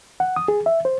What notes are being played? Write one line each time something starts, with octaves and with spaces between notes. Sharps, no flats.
F#5
D#6
G#4
E5
C5